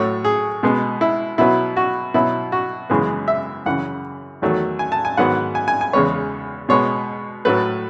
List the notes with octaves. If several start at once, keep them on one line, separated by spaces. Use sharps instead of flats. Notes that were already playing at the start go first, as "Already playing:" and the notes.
Already playing: A2 F#3 A3 C#5
G#4
B2 G#3 B3
E4
B2 F#3 B3 E4
F#4
B2 F#3 B3 E4
F#4
F#2 C#3 E3 G#3 B3
E5
F#2 C#3 E3 F#5
E2 D#3 F#3 A3
G#5
A5
G#5
G#2 D#3 F#3 B3 F#5
G#5
G#5
G#5
E2 C#3 G#3 B3 C#5
B2 G#3 B3 C#5
A2 F#3 A3 B4